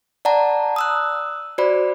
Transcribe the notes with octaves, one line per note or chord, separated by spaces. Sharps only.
D5 F#5 A5 A#5
D#6 E6 F#6
F#4 C5 D5 B5